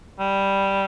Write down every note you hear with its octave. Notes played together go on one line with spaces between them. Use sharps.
G3